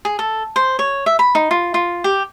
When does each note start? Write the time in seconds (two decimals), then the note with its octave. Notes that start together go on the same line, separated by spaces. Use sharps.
0.05 G#4
0.19 A4
0.56 C5
0.79 C#5
1.06 E5
1.19 B5
1.35 D#4
1.51 F4
1.74 F4
2.04 G4